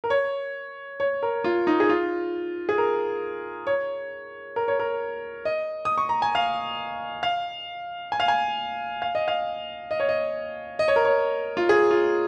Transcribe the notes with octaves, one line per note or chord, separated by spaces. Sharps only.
A#4
C#5
C#5
A#4
F4
D#4
G#4
F4
G#4
A#4
C#5
A#4
C#5
A#4
D#5
D#6
C#6
A#5
G#5
F5
F5
G#5
F5
G#5
F5
D#5
F5
D#5
C#5
D#5
D#5
C#5
A#4
C#5
F4
G#4
F4